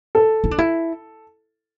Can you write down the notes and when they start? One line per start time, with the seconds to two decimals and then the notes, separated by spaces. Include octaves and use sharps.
0.15 A4
0.44 E4
0.51 D4
0.58 E4